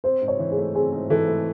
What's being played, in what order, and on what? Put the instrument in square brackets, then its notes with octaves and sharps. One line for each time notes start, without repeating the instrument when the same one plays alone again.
[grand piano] C4 [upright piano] C5
[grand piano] G#2
[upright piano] C#5
[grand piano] E3
[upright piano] G#4
[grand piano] A3
[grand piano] C4 [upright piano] G#4
[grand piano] G#2
[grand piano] E3 [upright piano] A4
[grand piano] A3